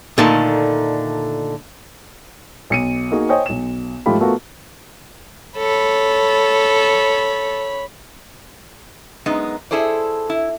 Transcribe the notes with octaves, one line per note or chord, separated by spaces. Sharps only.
A#2 D3 D#3 A3
B1 C#7 D#7
A#3 D#4 F#4 G#4
C5 C#5 D#5 G5 G#5 D#6
B1 E7
G#2 F3 A3 F4 G4 B5
A3 B3 F4 F#4 A#4
A4 C#5 B5
F#2 G#3 B3 D#4
E4 G#4 A4 C5 D5
E4